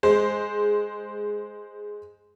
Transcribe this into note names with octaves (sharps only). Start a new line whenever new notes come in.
G#3 C5